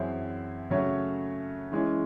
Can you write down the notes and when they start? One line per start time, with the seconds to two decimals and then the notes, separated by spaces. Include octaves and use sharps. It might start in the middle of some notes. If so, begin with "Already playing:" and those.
Already playing: F#2 E3 C4 E4 G#4
0.70 C#3 F#3 A3 C#4
1.72 E3 G#3 C#4